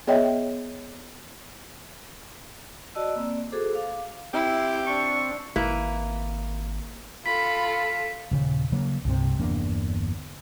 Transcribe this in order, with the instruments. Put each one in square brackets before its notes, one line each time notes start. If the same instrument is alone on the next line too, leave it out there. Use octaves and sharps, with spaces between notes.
[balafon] B3 G#4 C#5 D#5 E5 G5
[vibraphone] F#4 D5 D#5 A5 E6
A#3 C4 D5
F#4 G#4 A4 C5 D6
F5 D6
[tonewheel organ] C4 [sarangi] E4 [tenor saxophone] G4
[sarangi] D4 [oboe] C#6
[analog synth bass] G#1 [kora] A#3 E4 B4
[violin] F4 A4 [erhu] B5 [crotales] B6
[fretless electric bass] D#1 C#3
C#3 F#3 A#3
C2 G2 C3
G1 E2 A#3 D4